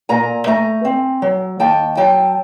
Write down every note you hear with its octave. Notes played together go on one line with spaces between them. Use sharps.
A#2 G#5 A#5
A3 G#5 A#5
C4
F#3
D#2 G5 A5
F#3 G5 A5